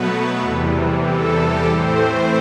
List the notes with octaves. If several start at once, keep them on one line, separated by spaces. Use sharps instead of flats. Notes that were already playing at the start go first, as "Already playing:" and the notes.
Already playing: B2 F#3 A3 B3 B4
E2 C3 E3 G3 A4
A4
G4
A2 E3 A3 C4 C5